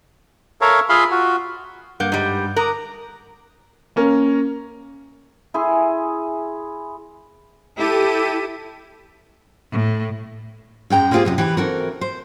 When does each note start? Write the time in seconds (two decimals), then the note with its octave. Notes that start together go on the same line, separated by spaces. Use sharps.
0.61 A4 A#4 C#5 E5 F5
0.89 F4 G#4 E5 F5 B5 C6
1.11 F4 F#4
2.00 G2 A#3 F#5 G6
2.12 G#2 G3
2.56 A#4 D6 D#6 F#6
3.96 A#3 C#4 A#4
5.54 E4 G#4 G#5 C6
7.77 E4 G4 A4 D#7
9.72 A2
10.90 F#2 G#3 G5 A#5
11.11 G#3 A#3 C4 F4 G4 G#4
11.25 F#2 C3 D#5
11.38 E3 G4 B4
11.57 E3 C4 F#4 A4 A#4
12.01 C5